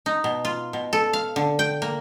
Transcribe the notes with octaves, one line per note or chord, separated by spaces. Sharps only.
D#4
B2
F4
B2
A4
F5
D3
G5
A#3